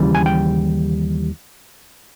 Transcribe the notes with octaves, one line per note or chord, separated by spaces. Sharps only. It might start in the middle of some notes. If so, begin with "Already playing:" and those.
Already playing: D#2 C#3 E3 G3
G#5
G5